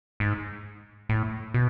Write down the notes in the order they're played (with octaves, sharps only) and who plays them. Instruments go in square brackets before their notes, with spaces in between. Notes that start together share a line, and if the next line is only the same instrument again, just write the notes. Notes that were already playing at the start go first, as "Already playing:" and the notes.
[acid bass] G#2
A2
B2